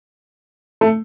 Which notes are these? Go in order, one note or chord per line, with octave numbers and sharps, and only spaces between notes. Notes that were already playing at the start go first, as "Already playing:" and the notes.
A3